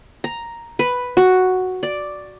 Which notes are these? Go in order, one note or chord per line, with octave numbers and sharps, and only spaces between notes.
A#5
B4
F#4
D5